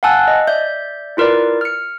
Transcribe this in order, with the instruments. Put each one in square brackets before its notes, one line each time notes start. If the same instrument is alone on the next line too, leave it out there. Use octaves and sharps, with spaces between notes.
[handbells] F5 F#5 G#5 A5 E6 F#6
D#5
D5 E5 G6
E4 F4 A#4 B4 D5
F6 C#7